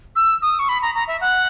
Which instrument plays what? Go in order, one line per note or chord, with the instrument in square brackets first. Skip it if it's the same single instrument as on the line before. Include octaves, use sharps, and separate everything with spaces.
[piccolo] E6
D#6
C#6
B5
A#5
A#5
E5
F#5